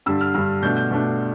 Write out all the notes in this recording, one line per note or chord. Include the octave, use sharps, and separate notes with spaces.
G2 D3 G3 E6
F6
G2 D3 G3 F6
B2 A3 D4 G6
G6
B2 A3 D4